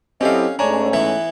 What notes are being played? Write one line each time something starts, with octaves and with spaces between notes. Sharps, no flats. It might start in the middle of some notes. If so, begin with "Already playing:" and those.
F#3 C4 C#4 E4 G4 A4 D#5 F5
G#2 A3 C#4 D4 C#5 G#5 A#5
E3 B3 E5